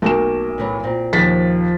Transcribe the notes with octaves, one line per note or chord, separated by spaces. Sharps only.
B1 A3 A#3 A#4 A5 E7
A2 E3 F#3
A#2 C4
D#2 F3 A6 B6